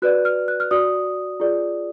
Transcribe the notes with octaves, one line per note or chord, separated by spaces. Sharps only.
F#4 B4 D5 F#6
F6
F#6
F6
F#4 D5 D#6
F4 G#4 D5